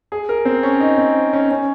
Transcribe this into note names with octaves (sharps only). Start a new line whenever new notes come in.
G#4
A#4
C4
C#4
D#4
C4
C#4
C#4